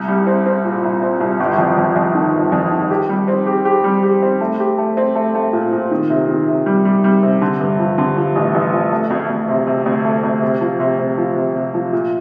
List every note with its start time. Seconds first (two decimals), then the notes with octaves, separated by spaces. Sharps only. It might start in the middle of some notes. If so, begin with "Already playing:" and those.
Already playing: C2
0.08 G3
0.27 C4
0.46 C4
0.65 A#2
0.83 C2
1.02 C4
1.20 C2
1.40 G1
1.58 F2
1.77 F2
1.96 F2
2.15 D#3
2.33 G1
2.52 F2
2.72 D#3
2.90 G4
3.09 G3
3.28 C4
3.47 G4
3.65 G4
3.84 G3
4.03 G4
4.22 C4
4.41 A3
4.60 G4
4.78 A3
4.97 C4
5.15 A3
5.35 A3
5.53 A#2
5.72 A#2
5.91 D#3
6.10 C3
6.28 D#3
6.47 C3
6.66 G3
6.85 G3
7.04 G3
7.23 C3
7.41 D3
7.60 G2
7.79 F3
7.98 D3
8.16 F3
8.35 A1
8.54 A1
8.73 F3
8.92 A3
9.10 D2
9.30 D2
9.48 C3
9.67 C3
9.86 D2
10.05 A3
10.23 D2
10.42 C3
10.61 F3
10.80 C3
10.99 C3
11.18 F3
11.36 C3
11.55 C3
11.74 F3
11.93 A#2